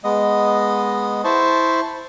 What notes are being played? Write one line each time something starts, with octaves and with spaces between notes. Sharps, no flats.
G#3 B3 D#5
E4 C5 A5 C#6